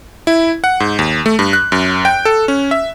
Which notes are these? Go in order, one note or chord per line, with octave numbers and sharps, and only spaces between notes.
E4
F#5
G#2
D#2
A3
G2
F#6
F#2
G5
A4
C#4
E5